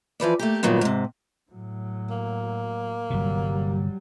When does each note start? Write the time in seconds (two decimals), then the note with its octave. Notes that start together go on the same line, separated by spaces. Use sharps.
0.20 E3 F3 B4 D5
0.39 A3 A#3 G4
0.63 G2 A#2 D#3 F#3 B3
0.81 G#2 C3
1.51 A2 F#3
2.10 A#3
3.10 G1 C3 F#3 G3